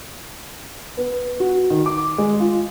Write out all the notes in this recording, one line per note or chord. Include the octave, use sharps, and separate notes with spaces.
B3
F#4
D#3
D6
G#3
F4